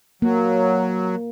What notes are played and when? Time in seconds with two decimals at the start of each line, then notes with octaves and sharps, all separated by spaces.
0.22 F#3 A#3